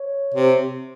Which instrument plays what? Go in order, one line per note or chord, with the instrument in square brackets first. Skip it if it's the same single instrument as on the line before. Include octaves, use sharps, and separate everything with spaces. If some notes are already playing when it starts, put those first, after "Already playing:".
Already playing: [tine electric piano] C#5
[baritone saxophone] C3